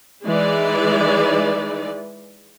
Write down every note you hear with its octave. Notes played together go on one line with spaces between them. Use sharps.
E3 G#3 D#4 B4 D5